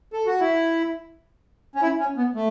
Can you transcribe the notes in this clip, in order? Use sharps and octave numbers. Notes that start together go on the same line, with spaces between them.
A4
F#4
E4
C#4
E4
C#4
B3
A3